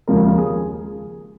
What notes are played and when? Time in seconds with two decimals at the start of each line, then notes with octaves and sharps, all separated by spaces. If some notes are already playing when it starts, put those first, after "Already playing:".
0.08 D#2 C#3 F3 G#3 A#4
0.37 G#4